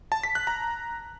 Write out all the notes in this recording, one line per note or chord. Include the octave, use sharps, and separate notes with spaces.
A5
B6
F#6
A#5